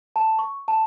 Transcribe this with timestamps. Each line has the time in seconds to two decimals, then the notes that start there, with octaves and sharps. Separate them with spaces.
0.16 A5
0.39 C#6
0.68 A5